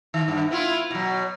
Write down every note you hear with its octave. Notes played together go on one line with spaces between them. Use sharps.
D#3
G2
B3 E4 F4
B2 F#3